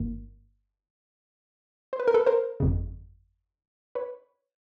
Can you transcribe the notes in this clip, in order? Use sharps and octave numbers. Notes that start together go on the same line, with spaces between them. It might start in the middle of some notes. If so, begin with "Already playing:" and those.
Already playing: G1 G2 D#3 A#3
C5
B4
A#4
A4 B4
A#4 C5
G1 F2 C#3
B4 C#5